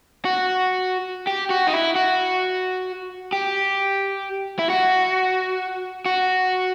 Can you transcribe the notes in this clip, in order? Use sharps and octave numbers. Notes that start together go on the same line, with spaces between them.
F#4
G4
F#4
D#4
E4
F#4
G4
E4
F#4
F#4